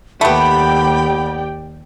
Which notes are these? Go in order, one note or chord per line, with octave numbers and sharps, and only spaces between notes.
D#2 A3 B3 G4 D5 G5 B5